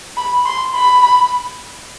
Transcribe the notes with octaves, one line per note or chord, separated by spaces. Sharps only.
B5
C6
B5